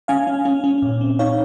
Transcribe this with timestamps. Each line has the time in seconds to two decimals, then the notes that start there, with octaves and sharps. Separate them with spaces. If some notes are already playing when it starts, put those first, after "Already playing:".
0.08 C#4 F5 G#5
0.27 C#4
0.45 C#4
0.64 C#4
0.82 A#2
1.01 C4
1.19 D#4 C#5 F5